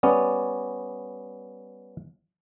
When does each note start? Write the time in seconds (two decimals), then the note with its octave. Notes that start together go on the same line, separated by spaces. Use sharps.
0.03 G3 B3 C#4 D5